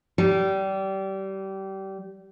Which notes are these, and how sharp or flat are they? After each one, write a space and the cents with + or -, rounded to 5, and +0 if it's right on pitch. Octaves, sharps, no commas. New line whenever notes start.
G3 -25